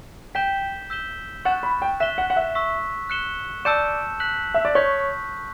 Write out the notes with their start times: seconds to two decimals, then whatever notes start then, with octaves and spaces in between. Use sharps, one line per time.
0.35 G5 G6 B6 E7 G7
0.90 E6 G6 B6 E7 G7
1.45 F#5 C#6 F#6 A6 E7
1.63 B5
1.82 G5
2.00 E5 F#6 B6 E7 G7
2.18 F#5
2.30 F#5
2.36 E5
2.55 C#6 E6 B6
3.09 F#6 C#7 E7 G7
3.65 D5 A5 E6 G6 C#7 E7
4.20 F#6 B6 F#7
4.54 E5
4.65 D5
4.75 C#5 C#6 G6 B6